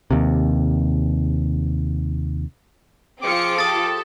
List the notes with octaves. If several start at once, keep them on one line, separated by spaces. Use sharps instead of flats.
D#2 C3
F3 C4 F4 G#4 D6 C#7
G4 A4 D#6 A6